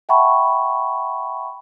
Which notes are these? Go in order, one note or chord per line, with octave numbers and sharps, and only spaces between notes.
E5 F#5 G5 A5 B5 C#6